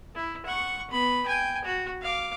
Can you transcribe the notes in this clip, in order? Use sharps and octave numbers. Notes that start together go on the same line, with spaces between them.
E4
F#5 C#6
B3 B5
G5 G#5
F#4
F5 D6